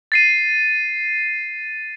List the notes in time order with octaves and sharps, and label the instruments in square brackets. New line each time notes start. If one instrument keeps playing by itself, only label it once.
[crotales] A6 C7 D#7